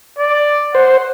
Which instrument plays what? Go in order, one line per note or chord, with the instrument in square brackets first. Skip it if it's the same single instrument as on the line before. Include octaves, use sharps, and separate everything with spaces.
[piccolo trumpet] D5
[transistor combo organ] C5 [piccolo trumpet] F#5